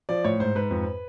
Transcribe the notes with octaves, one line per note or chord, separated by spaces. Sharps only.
F3 D5
A2 C#5
G#2 C5
G#2 B4
F2